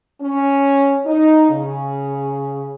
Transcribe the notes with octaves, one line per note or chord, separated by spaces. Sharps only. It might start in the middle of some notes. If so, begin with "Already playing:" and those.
C#4
D#4
C#3